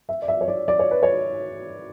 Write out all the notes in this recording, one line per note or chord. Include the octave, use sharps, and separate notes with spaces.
E5
D5
E5
C#5
D5
D5
C#5
B4
C#5